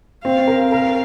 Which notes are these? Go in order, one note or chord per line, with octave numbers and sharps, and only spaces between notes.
C4 F5
A#4
A#4 F5